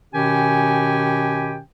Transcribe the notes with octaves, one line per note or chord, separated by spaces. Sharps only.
B2 D#3 C#4 G4 G5 G#5